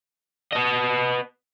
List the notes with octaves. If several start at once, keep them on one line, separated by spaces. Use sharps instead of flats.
B3 D#5